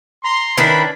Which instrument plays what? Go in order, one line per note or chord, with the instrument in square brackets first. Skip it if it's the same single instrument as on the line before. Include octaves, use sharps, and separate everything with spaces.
[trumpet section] A#5 C6
[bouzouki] D#3 E4 B4 [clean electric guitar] C#4 D4 [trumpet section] B5